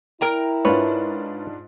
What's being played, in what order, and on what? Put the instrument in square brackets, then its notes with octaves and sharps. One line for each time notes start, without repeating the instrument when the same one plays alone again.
[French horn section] E4 [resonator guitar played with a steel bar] A#4 G5 A#5
[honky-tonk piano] G#2 D4 F4 [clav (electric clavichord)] B4 C#5